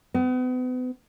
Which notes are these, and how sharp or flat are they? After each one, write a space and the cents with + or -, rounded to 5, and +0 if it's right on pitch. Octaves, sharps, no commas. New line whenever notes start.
B3 +40